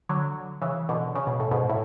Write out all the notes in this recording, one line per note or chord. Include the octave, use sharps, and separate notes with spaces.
D3 F#3
C#3 E3
B2 D3
C#3
B2
A2
G#2 B2
A2